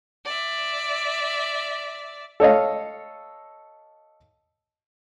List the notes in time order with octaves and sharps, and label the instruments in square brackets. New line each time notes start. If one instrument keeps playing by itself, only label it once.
[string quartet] D5 E5
[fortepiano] A4 C#5 D#5 F5